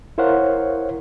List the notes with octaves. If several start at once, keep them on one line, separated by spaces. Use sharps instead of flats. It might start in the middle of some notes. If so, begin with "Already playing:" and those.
E4 A#4 C5 C#5 F5 F#5